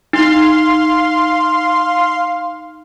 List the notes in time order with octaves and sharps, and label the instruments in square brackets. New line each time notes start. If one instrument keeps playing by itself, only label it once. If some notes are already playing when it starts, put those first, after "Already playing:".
[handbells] D#4 [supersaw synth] F5 C6